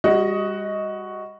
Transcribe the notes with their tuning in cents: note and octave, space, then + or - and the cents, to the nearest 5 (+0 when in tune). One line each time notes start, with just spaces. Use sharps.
G3 +35 F#4 +0 D#5 +15